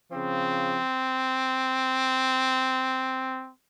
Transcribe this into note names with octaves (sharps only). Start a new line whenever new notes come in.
C#3 F3 C4